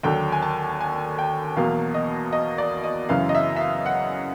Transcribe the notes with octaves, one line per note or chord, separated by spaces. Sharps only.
D#2 D3 F#3 G5
G#5
A5
G#5
G5
E2 B2 F#3 A#3 F5
D#5
D#5
D5
D#5
F#2 C#3 E3 F5
D#5
E5
E5
F5
F#5